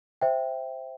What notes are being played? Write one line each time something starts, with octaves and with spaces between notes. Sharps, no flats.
C5 E5 G5